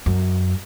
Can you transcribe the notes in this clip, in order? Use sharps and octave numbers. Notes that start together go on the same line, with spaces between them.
F#2